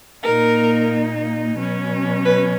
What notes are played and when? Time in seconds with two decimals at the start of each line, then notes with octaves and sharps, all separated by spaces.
0.23 A#2 A#3 D#4 A#4
1.57 B2 F#3 C#4
2.25 B4